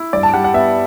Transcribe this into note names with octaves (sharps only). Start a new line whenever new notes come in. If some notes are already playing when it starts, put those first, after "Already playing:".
Already playing: E4
G2 D5
A5
G3 F#5
F#5
B3 E5